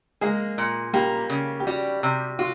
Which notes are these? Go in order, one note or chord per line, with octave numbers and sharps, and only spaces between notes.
G#3 A#3 G#4
A#2
G3 A#3 G4
C#3
G4
G3 F#4
C3
F4 F#4